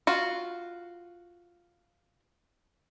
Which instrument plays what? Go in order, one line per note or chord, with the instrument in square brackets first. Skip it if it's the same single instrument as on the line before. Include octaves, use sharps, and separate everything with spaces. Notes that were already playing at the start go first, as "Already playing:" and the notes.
[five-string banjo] F4 F#4